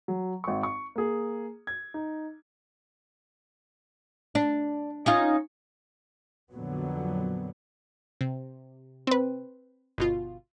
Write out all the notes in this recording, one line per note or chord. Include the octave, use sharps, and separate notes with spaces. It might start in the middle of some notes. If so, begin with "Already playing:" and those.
F#3
G#1 C#6
C#6
A#3 G#4
G#6
D#4
D4
C#4 D#4 F4
F2 A#2 D3 F#3 B3
C3
C4 B4
G1 B2 F4